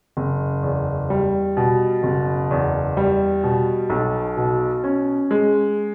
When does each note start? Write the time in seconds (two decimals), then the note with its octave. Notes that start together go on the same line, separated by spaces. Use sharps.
0.17 F#1
0.63 E2
1.10 G3
1.57 B2
2.03 F#1
2.51 E2
2.97 G3
3.43 B2
3.90 B1
4.37 B2
4.84 C#4
5.31 G#3